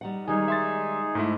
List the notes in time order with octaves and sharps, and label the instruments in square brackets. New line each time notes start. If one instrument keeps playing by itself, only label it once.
[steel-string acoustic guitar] G3 D#4 F#5
[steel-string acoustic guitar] D#3 G3 G#3 [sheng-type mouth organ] D#4 G#4 [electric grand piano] G#5
[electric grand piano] E5 C6 A6
G#2 A3 E4